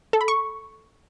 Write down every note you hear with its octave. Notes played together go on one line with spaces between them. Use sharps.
A4
B5
C#6